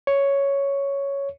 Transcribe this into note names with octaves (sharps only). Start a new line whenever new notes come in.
C#5